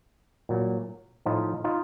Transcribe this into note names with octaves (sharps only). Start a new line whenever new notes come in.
A#2 F#3
A2 F3 D#4 F4
D#4 F4